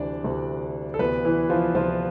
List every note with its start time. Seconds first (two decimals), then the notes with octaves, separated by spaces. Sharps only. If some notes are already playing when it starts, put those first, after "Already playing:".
Already playing: D2 C3 E3 D4 D5
0.24 D2 C3 E3
0.94 A4
0.99 D2 C3 E3 B3 B4
1.25 E3 E4
1.50 F3 F4
1.75 D2 C3 E3 F3 F4